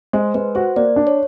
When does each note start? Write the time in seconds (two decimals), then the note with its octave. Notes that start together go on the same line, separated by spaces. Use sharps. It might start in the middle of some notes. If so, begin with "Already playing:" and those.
0.13 G#3 C5
0.34 G#3 B4
0.55 F#4 C5
0.76 A#3 D5
0.96 D4
1.07 C#5